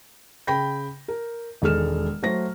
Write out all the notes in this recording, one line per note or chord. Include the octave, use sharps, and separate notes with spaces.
C#3 G5 B5 G6 A#6
A#4
E1 D#3 G#3 A4 F6 E7
F#3 A3 C5 A#6